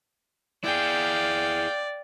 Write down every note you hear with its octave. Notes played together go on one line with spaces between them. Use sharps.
E4 G#4 D5 F5 G5